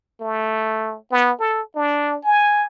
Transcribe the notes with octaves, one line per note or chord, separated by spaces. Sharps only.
A3
B3
A4
D4
G#5